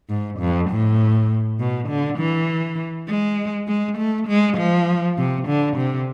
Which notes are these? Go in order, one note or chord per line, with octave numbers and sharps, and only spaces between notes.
G#2
F2
A2
B2
D3
E3
G#3
G#3
A3
G#3
F3
C3
D3
C3